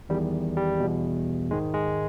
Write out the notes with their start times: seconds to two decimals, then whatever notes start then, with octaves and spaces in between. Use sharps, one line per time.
0.09 E2 D#3 G3
0.57 G3
0.80 E2 B2
1.50 G#2 D#3 G#3
1.74 G#3